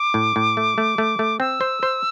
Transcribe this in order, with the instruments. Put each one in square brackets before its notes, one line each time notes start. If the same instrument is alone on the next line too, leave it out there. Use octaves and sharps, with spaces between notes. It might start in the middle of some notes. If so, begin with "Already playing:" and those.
Already playing: [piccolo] D6
[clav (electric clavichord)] A2
A2
A3
A3
A3
A3
[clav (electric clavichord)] C4 [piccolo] E6
[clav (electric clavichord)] C5
C5